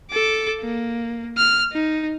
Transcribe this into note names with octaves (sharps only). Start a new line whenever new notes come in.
A4 D6
A#3
F6
D#4